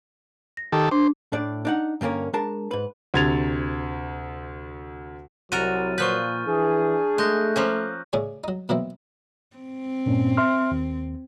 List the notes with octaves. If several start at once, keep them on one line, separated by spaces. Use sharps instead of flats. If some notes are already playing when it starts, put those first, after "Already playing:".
A#6
D#3 G4 A4
D4 C5
A2 D4 D5
D4 D#4 F#5
G2 D3 A#3 C#4 A#4
G#3 D4 A#4 A5
G#2 B4
D2 C3 G#6 A6 F7
C2 F#3 F#4 A#4 F6 A6 D#7
A#2 F3 B4 C#6 F6 G6
E3 D4 G#4
G#3 A3 F#6 G6 A#6
F3 A#3 C#4
A2 C#3 C#4 D4 G#4 C#5
F#3 D#4
B2 E3 F#3 A#3 C4 E4
C4
G2 A#2 C#4
E5 C6 F6
D#2